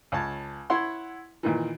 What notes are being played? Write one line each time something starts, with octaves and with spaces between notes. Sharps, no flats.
C#2 C#5 A5
E4 C#5 F#5 C6
A#2 D#3 E3